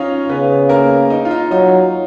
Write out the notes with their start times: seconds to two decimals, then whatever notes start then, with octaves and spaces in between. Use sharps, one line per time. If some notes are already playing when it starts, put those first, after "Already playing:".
Already playing: C#4 D#4 F4 C#5 D#5 F5
0.29 C#3 B3 B4
0.69 A#3 A#4
1.10 D#4
1.25 F4
1.31 D#4
1.51 F#3 D#4